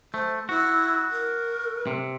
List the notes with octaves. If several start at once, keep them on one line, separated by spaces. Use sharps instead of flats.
A3 C5
E4 F#4
A#4
C3